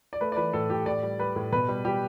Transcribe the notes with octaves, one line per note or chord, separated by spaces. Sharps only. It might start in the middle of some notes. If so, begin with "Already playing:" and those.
D5
A3 B4
D5
E3 B4
A2 A4
A2 G4
A2 D5
G3
G3 B4
A2
B2 B4
G3
G3 G4